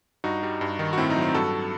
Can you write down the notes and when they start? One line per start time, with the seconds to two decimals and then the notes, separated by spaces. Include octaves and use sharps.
0.24 G2 D#4 F#4
0.43 G3
0.61 G2
0.79 D#3
0.93 F#4
0.97 A2 C4 E4
1.10 D#4
1.16 F#3
1.22 C4
1.34 G2 F#4 A4